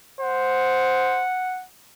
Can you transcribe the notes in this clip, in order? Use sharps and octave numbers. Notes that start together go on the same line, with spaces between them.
C5 F#5